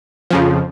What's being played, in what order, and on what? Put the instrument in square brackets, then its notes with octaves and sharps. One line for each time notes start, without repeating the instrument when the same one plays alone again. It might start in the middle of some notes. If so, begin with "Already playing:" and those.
[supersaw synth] F2 C#3 F3